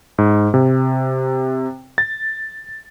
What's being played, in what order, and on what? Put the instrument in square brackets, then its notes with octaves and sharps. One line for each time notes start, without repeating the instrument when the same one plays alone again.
[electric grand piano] G#2
C3
A6